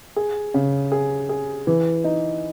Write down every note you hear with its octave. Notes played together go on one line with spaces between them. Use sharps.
G#4
C#3
G#4
G#4
E3
D#4